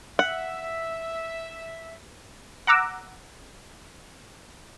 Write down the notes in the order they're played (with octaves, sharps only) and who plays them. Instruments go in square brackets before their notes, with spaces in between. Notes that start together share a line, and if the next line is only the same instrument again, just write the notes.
[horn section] E5 [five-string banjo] F#5
[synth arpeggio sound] F#5 A#5 D6 E6